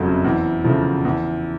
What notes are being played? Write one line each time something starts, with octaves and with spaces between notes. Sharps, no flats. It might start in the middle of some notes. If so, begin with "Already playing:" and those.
Already playing: F#1 F2 C#3 F#3 A3
E2
C#3 F3 A3
E2